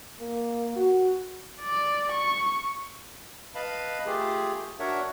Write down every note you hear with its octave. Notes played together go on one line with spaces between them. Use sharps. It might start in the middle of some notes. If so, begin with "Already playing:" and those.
A#3
F#4
D5
C#6
B4 D#5 F5 A5 B5
A3 F4 G4 G#4
D4 F#4 A#4 C#5 E5 F#5